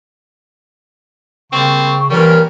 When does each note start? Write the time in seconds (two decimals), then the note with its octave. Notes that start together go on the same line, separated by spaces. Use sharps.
1.52 C#3 G3 A#3 C4 C#6
2.11 A#2 E3 G3 C#4 A#4